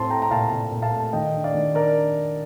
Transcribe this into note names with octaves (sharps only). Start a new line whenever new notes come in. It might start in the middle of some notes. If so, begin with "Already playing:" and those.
Already playing: A2 C4 A5 C6
A3 G5 A#5
A#5
A#2 F5 A5
A#2
A#2
F5 A5
A3
D#3 D#5 G5
D4
D5 F5
D#3
D4 A#4 D5